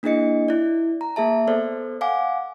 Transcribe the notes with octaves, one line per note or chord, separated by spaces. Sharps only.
A#3 D4 E4 G#4 D#5 C#7
E4 D5
A#5
A#3 G#4 E5 A5
B3 A4 C5 D5
F5 F#5 G#5 D6